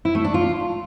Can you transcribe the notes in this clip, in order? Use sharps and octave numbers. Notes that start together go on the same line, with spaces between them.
E4
A3
D4
F4